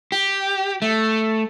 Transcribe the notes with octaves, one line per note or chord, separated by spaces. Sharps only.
G4
A3